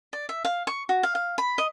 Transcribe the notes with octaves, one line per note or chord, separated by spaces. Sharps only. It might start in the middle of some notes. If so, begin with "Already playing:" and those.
D5
E5
F5
C#6
F#4
F5
F5
B5
D#5